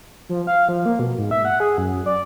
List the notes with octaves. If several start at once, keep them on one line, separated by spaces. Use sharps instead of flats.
F3
F5
F3
A#3
B2
G#2
E5
F#5
G#4
F#2
D5